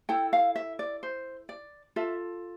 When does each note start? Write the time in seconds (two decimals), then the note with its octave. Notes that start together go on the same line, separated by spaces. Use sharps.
0.09 E4 A4 G5
0.33 F5
0.56 E5
0.79 D5
1.03 C5
1.49 D5
1.96 F4 A4 E5